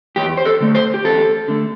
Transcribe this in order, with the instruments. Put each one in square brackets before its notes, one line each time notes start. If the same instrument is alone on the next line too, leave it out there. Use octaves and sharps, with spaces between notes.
[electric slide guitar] E2 G4
C5
A4
D3 A3
C5
G4
E2 A4
D3 A3